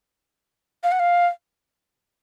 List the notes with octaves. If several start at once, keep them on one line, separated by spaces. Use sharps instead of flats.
F5
F#5
F5